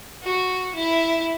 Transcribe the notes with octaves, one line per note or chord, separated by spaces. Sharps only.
F#4
E4